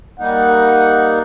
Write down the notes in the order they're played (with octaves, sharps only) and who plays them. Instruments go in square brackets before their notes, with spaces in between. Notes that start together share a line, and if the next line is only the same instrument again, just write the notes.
[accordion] G3 A#3 D#4 [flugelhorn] F#5